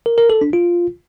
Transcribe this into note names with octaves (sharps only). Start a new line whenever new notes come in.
A#4
A#4
A4
D4
F4